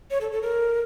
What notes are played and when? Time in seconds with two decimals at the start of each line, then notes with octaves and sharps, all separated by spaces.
0.11 C#5
0.21 A4
0.32 A4
0.42 A#4